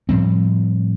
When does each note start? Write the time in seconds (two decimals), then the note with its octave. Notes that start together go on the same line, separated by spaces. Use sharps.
0.09 A2 F3 G3 C4